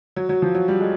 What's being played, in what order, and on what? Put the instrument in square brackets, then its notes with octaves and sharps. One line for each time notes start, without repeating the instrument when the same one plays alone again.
[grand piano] F#3
F#3
F3
F#3
G3
G#3